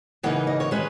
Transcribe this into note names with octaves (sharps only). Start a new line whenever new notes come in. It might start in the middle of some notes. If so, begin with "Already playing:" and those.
C#3 E3 A#3 D#4 F#5
D#5
C#5
D#3 G#3 C#4 B4